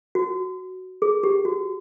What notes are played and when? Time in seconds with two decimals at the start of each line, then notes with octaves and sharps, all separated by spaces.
0.15 F#4
1.02 G#4
1.23 G4
1.45 F#4